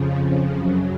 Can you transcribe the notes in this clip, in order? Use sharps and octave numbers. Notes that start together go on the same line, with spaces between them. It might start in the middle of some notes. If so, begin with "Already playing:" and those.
Already playing: F2 C#3 F3
F#2 C#3 F#3